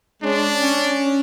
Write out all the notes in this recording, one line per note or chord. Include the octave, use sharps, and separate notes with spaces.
G#3 C#4 D4
C#4